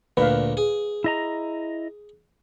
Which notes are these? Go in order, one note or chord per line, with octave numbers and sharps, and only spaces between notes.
D2 A#2 B4 F5
G#4
E4 D#5 A#5